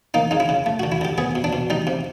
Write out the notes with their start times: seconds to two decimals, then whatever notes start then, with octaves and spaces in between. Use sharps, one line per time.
0.14 A#3 D#4
0.31 C#3 D#4
0.40 E4
0.49 C#3
0.66 A3
0.80 D3 F#4
0.92 E4
1.01 D3 G4
1.18 B3 G#4
1.35 B2
1.44 D4
1.53 B2
1.70 G3 D#4
1.87 C3